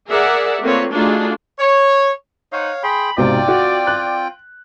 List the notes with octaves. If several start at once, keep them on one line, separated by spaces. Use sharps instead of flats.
G#4 A#4 D5 E5 F#5
A3 A#3 C4 F4 B4 C#5
A3 D4 D#4 F4 F#4 G#4
C#5
D#4 C5 C#5 F5 F#5
G#4 G5 B5 C6
B1 G#2 C3 C4 F4 D5 G5
F#4
F#6